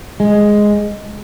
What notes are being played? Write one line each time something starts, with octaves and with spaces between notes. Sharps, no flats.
G#3